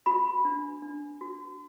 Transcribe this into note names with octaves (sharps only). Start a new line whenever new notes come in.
F#4 B5
D4
D4
F#4